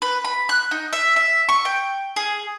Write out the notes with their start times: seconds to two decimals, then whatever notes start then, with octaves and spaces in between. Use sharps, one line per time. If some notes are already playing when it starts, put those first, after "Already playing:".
0.02 B4
0.24 B5
0.49 F#6
0.71 D#4
0.93 E5
1.16 E5
1.49 C#6
1.65 G5
2.16 G#4